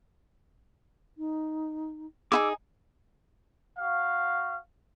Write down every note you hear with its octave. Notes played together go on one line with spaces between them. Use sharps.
D#4
D#4 E4 G#4 D6 E6
F#4 F5